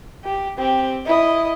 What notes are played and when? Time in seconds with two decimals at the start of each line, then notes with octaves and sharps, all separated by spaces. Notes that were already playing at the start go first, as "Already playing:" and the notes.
0.24 G4
0.58 C4 G4
1.06 E4 D#5